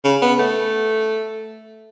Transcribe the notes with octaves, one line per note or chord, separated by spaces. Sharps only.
C#3
B3
A3